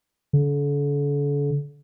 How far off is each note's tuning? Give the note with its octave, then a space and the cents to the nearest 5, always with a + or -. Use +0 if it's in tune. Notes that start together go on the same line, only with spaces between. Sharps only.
D3 -40